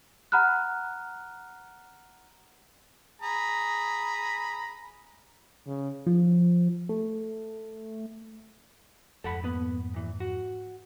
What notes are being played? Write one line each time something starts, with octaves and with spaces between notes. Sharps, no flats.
F#5 A#5 B5 F6 F#6
G#4 A#5 B5
C#3
F3
A3
F2 G#2 A4 F#5 B5
A#3 B3 B4
A#2 E3
F#4